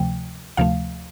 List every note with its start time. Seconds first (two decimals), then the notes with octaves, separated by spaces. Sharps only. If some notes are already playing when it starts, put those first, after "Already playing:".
Already playing: D2 C3 F3 A3 G5
0.57 D2 C3 F3 A3 F5